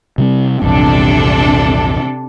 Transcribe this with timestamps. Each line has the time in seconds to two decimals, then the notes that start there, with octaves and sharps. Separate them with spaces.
0.18 C3 G3 C4
0.62 A#1 E2 G2 C3 D4 A4